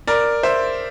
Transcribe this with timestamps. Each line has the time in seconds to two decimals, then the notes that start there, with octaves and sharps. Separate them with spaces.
0.07 A#4 D5
0.43 C5 E5